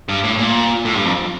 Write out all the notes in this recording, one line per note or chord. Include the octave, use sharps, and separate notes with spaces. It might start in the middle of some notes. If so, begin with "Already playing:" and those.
G2
A2
A#2
A2
G2
F2